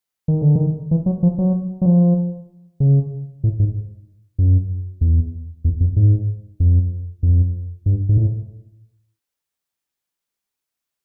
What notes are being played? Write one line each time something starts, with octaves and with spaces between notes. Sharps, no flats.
D#3
D3
D#3
E3
F#3
F3
F#3
F#3
F3
C#3
A2
G#2
F#2
E2
E2
F2
G#2
F2
F2
G2
G#2
A2